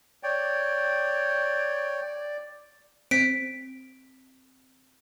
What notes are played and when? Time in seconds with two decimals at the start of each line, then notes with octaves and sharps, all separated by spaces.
0.23 C#5 D5 G5
3.11 C4 B6 D7